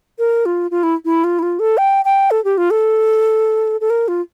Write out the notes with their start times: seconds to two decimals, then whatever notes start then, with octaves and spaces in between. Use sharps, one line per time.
0.19 A#4
0.46 F4
0.71 F4
0.83 E4
1.05 E4
1.24 F4
1.39 E4
1.43 F4
1.60 A4
1.78 G5
2.05 G5
2.31 A4
2.44 G4
2.58 F4
2.71 A4
3.81 A4
3.90 A#4
4.08 F4